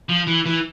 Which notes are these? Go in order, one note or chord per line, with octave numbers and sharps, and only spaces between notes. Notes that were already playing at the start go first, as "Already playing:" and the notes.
F3
E3
E3